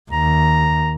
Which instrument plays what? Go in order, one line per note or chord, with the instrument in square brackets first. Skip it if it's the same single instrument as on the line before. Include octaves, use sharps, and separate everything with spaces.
[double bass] D#2 [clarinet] A#5